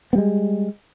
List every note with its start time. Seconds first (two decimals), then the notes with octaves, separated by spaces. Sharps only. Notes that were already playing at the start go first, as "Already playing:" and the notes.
0.13 B3
0.15 G3
0.18 G#3